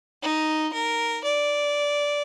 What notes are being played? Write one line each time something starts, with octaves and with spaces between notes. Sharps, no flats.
D#4
A#4
D5